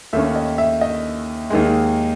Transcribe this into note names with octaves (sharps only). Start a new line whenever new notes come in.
D#2 D#3 A3 C#4 E5
D#5
E5
D#5
D#2 D#3 G#3